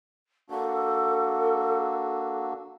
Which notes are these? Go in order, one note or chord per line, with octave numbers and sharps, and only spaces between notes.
A#3 D4 F#4 A4